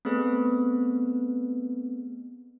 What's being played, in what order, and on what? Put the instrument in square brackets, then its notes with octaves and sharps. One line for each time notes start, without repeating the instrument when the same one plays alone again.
[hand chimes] A3 B3 C4 G#4 B4